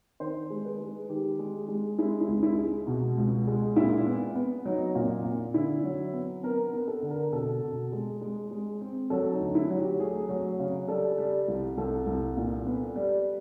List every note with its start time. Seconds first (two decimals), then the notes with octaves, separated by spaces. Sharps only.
0.20 D#3 C5
0.50 G#3
0.65 B4
0.80 G#3
1.09 D#3 G4
1.39 G#3
1.68 G#3
1.99 G#3 E4
2.21 E4
2.28 C#2
2.43 E4
2.58 G#3
2.87 B2
3.18 C#2
3.47 G#3
3.76 A#2 E4
4.07 B3
4.36 B3
4.65 F#3 D#4
4.95 A#2
5.24 A#2
5.54 D3 E4
5.84 F#3
6.14 B3
6.43 B3 A#4
6.66 A#4
6.74 B3
6.88 A4
7.02 D3
7.11 A#4
7.32 B2 A4
7.62 B2
7.92 G#3
8.21 G#3 G#4
8.51 G#3
8.81 C4
9.10 F#3 A4
9.33 D#4
9.40 D2
9.55 E4
9.70 F#3
9.77 G4
9.99 A3 G#4
10.29 F#3
10.59 C#3
10.88 G3 A4
11.18 G3
11.48 C2
11.78 C2 A4
12.07 C2
12.37 A#2
12.67 B3
12.96 G3